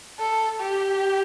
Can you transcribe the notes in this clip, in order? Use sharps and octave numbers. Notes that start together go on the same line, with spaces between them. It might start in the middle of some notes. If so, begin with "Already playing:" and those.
A4
G4